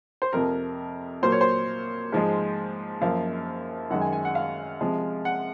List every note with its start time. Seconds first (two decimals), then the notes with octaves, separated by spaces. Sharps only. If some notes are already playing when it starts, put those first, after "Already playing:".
0.22 C5
0.33 F2 C3 F3 A#4
1.22 A#2 F#3 A#3 C5
1.32 C#5
1.41 C5
2.12 G#2 F3 G#3
3.01 F#2 F3 A#3 F5
3.90 F#2 D#3 G#3 F#5
4.01 G#5
4.13 G#5
4.25 F#5
4.35 F5
4.81 C3 F3 G#3
5.25 F#5